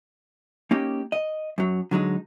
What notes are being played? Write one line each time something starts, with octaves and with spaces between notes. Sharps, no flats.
A#3 C#4 D#4 G4
D#5
F#2 F#3
D3 F#3 G#3 D#4